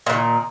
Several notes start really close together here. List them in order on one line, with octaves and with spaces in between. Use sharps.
A#2 E3 D#3